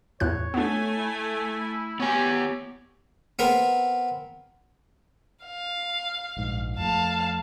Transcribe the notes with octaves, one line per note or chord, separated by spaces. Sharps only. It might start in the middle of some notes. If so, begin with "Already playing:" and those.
E2 A2 C#5 F#6
A3 B3 D4 G#5
E4
B3 G4 C#5 G#5
B3 C4 A#4
F5
A#1 G#2
F2 A3 F5 A5